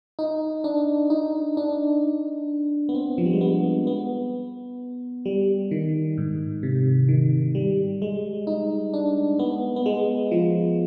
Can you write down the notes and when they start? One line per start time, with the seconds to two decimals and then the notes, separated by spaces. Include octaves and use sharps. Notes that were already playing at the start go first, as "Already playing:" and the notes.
0.19 D#4
0.64 D4
1.10 D#4
1.57 D4
2.89 B3
2.95 C4
3.18 F3
3.26 G3
3.33 G#3
3.41 B3
3.87 B3
5.25 G3
5.71 D#3
6.18 G#2
6.63 C3
7.08 D#3
7.55 G3
8.02 G#3
8.47 D#4
8.94 D4
9.39 B3
9.76 B3
9.86 G#3
10.31 F3